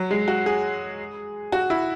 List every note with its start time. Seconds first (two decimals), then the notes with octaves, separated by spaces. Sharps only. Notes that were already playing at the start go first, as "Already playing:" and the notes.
Already playing: F#3
0.11 G#3
0.28 F#4
0.46 G#4
1.52 F#4
1.70 E4